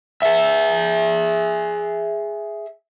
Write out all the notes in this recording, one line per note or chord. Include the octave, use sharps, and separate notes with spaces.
G#4 E5